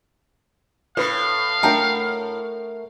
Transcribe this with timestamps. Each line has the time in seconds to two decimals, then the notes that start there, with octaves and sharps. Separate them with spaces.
0.97 A2 B4 F5
1.63 A3 A#4 F#5 G5 A5 A#5